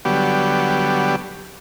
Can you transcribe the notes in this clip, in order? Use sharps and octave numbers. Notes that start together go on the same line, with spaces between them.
D3 F#3 G3 B3 G4